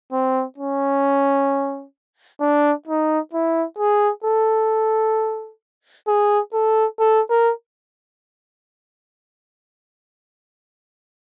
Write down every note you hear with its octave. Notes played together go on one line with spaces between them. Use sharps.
C4
C#4
D4
D#4
E4
G#4
A4
G#4
A4
A4
A#4